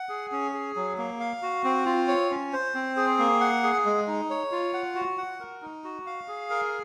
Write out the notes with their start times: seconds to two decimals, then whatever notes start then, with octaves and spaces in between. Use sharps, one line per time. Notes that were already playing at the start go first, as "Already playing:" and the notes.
Already playing: F#5
0.09 G#4
0.32 C#4
0.54 G#4
0.76 F#3
0.98 A#3
1.20 F5
1.42 F#4
1.64 C4
1.86 F4
2.08 C#5
2.31 C#4
2.53 C5
2.74 C4
2.97 G#4
3.19 A#3
3.41 F#5
3.63 G#4
3.85 G#3
4.07 D#4
4.30 C#5
4.52 F4
4.73 F#5
4.95 F#4
5.18 F#5
5.40 A#4
5.62 D#4
5.84 F#4
6.06 F5
6.28 G#4
6.50 A#4